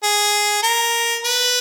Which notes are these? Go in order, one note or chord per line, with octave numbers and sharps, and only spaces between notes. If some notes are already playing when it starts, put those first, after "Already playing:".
G#4
A#4
B4